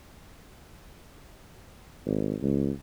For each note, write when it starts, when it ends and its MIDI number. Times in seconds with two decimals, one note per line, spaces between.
2.05 2.35 32
2.42 2.71 37